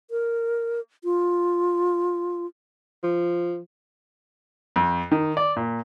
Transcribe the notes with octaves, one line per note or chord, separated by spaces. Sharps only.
A#4
F4
F3
F2
D#3
D5
A#2